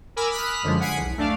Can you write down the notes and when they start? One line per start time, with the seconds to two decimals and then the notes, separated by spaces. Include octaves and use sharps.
0.16 A#4 G#5 B5 D6 E6 F6
0.30 B5 D#6 F6 F#6 B6
0.63 F#2 D3 F3 G#3
0.80 F#5 G#5 B6 C7 D7
0.96 B1 E2
1.18 A3 D4 D5 F5